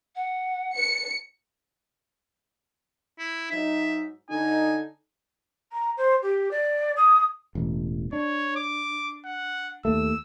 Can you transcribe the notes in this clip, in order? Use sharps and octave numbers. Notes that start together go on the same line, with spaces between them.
F#5
B4 C#7
E4
G#2 F#3 D#4 E5
D3 D#4 G#5
A#5
C5
G4
D5
D#6
E1 A1
D4 C#5
D6
F#5
D#2 A3 E6